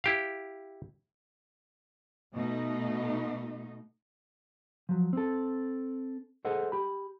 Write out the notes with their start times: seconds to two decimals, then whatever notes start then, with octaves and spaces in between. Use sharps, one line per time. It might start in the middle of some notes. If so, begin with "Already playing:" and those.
0.04 E4 G4 F5
2.34 B2 A3 D#4
4.89 F3 F#3
5.13 C4 A4
6.45 G#4 A4 C5 D#5 F#5
6.72 G4 B5